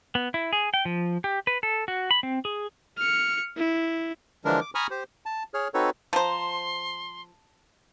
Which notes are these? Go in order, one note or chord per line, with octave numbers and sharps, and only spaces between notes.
B3
E4
G#4
G5
F3
G4
B4
A4
F#4
B5
C4
G#4
F6 C#7
E4
D3 E3 F3 G#3 D4 A#4
D6
G#5 A#5 B5 C#6 D#6 F6
G4 C5
A5
G#4 C#5 F6
C4 D#4 F#4 A4 B4 C#5
F3 C5 A5 A#5 C6